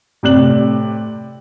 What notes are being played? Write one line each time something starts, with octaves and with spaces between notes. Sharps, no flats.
A2 C3 D5 F#6 F#7